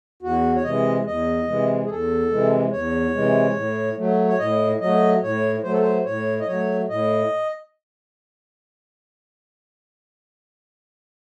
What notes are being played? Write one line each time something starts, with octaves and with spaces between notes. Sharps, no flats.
E2 F#4
C#5
C3 E3 G#3 D#5
E2 D#5
C3 E3 G#3
G#4
E2 A4
C3 E3 G#3
E2 C#5
C3 E3 G#3
A2
F#3 A3
C#5
A2 D#5
F#3 A3 D#5
A2 C#5
F#3 A3 C5
A4
C5
A2 C#5
D#5
F#3 A3 C#5
A2 D#5